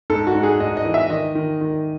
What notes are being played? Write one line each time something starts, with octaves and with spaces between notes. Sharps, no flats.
G#2 A4
F#4
G#2
G#4
G#2 D#5
D#5
E3
E5
D#3 D#5
D#3
D#3